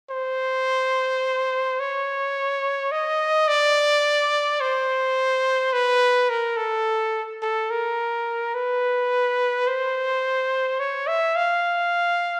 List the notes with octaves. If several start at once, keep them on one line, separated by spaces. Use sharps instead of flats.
C5
C#5
D#5
D5
C5
B4
A#4
A4
A4
A#4
B4
C5
C#5
E5
F5